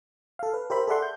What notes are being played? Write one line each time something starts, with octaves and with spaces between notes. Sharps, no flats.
A4 F5
B4
G4 A#4 C5 E5 B5
G#4 A4 D5 E5 F#5 C6
G6